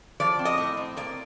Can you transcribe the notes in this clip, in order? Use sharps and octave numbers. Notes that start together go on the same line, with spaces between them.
F3 D5
C4
D#5
A2
C4
A#3 D5